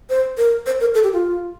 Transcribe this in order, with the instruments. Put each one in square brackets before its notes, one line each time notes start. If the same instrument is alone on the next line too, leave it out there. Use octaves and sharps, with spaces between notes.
[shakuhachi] C5
A#4
C5
A#4
A4
G4
F4